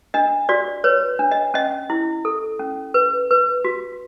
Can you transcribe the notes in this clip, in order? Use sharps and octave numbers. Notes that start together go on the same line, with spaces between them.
D4 D#5
F#4 D5
B4 C#5
D4
D#5
C#4 D#5
E4
A4
C#4
B4
B4
F#4